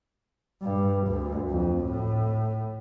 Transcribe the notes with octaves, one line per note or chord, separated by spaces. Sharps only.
G2
D2
F2
A2